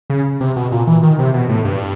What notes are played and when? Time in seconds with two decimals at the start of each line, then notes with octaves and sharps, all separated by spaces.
0.10 C#3
0.40 C3
0.56 B2
0.72 A#2
0.87 E3
1.03 D#3
1.19 C3
1.34 B2
1.49 A2
1.65 G2